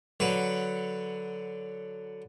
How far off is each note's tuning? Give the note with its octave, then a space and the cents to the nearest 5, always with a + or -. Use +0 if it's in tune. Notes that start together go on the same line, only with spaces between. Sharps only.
D3 +0 F#3 +0 B4 +0